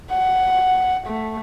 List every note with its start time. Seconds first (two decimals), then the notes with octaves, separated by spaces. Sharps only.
0.11 F#5
1.07 A3